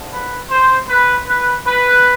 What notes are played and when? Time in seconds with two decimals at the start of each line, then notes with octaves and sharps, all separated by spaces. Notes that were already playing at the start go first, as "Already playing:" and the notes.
Already playing: E2 D3 F3
0.11 B4
0.50 C5
0.88 B4
1.27 B4
1.66 B4